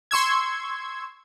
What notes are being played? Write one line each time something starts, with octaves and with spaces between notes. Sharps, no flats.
C6 C#6 E6 G#6